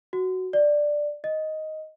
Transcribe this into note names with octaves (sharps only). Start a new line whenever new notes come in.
F#4
D5
D#5